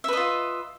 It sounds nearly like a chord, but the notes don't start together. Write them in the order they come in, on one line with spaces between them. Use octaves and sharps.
E5 B4 D#5 F4